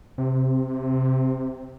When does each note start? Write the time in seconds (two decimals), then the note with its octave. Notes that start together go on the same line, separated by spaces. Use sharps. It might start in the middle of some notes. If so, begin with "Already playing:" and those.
0.18 C3